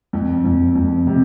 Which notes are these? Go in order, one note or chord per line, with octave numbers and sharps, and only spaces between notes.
F2
F2
F2
C3